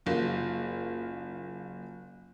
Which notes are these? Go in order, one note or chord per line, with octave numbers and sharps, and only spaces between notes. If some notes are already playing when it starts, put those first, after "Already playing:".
F#1 A#3 F4